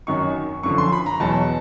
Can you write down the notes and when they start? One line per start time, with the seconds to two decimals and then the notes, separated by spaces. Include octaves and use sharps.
0.07 F#2 D#3 F#3 C#6
0.63 F#2 D3 F3 C#6
0.78 C6
0.92 B5
1.06 A#5
1.20 E2 B2 F#3 A5